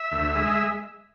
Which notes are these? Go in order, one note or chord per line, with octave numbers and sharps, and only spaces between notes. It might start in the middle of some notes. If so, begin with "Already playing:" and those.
Already playing: E5
D2
G#3